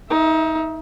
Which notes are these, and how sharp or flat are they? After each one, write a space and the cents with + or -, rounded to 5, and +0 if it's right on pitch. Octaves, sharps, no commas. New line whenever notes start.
D#4 +25 E5 +0